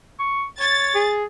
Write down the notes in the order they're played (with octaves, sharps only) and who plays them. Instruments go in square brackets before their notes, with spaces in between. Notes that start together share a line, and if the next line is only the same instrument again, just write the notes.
[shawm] C#6
[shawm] C#5 [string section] A6
[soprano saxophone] G#4